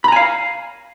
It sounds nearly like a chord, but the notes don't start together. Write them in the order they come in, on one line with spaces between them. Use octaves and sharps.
B5 A#5 G#5 F5